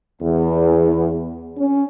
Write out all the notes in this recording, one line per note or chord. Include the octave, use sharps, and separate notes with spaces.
E2
C#4